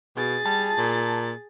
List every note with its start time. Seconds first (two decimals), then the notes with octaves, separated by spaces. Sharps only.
0.17 B2 G#4 A6
0.46 G3 A5
0.78 A#2